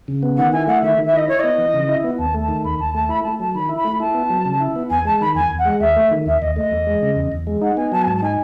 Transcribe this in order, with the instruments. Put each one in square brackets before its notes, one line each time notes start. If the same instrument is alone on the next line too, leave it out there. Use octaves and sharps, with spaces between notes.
[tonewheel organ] C#3
B3
[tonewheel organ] D#3 [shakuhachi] F#5
[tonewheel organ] E4 [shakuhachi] G#5
[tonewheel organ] A3 [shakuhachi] F#5
[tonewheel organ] D#3 [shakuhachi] E5
[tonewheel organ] D#3
[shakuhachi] E5
[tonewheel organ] E4 [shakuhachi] D#5
[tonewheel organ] E4 [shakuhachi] C#5
[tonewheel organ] B3 [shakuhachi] D#5
[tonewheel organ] E3
C#3
E4
B3
[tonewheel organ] D#2 [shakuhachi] A5
[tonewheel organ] A3
[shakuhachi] A5
[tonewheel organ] D#3
[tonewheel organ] D#2 [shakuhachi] B5
[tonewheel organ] D#2 [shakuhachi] A5
[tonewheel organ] A3 [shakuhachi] A5
[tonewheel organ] E4 [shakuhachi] B5
[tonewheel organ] A3 [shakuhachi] A5
[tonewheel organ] F#3 [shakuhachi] A5
[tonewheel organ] D#3 [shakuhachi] B5
[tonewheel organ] E4
[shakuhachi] B5
[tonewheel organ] A3
[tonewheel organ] E4 [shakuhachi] A5
[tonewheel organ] B3
F#3
C#3
E4
B3
[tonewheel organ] E2 [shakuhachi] G#5
[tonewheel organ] G#3 [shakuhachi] A5
[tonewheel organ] D#3 [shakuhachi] B5
[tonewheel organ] E2 [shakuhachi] G#5
[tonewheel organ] E2
[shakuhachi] F#5
[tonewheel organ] G#3
[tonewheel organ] D#2 [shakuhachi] E5
[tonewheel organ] A3
D#3
[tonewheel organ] D#2 [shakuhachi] E5
[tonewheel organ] D#2 [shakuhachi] D#5
[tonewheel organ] A3 [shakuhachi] D#5
[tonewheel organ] E2
G#3
C#3
E2
E2
G#3
[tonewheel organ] D#4 [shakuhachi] F#5
[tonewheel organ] B3 [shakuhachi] G#5
[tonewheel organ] F#3 [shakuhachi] A5
[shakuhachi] G#5
[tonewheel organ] G#2 [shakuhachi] A5
[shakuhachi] A5
[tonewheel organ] D#4 [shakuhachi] G#5